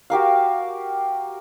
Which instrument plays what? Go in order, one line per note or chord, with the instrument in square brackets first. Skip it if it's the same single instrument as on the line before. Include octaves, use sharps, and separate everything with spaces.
[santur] F#4 G4 A#4 F5